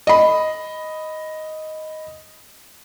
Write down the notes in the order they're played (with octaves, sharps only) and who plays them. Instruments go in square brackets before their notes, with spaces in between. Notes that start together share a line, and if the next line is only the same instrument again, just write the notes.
[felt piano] D#5 B5